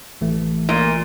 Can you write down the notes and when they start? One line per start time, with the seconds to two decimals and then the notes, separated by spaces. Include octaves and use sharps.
0.21 A1 E3 A3
0.69 A#2